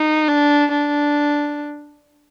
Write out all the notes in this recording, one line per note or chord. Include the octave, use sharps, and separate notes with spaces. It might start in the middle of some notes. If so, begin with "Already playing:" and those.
Already playing: D#4
D4
D4